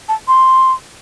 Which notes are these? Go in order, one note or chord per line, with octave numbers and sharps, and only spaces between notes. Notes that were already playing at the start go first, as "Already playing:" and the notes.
A5
C6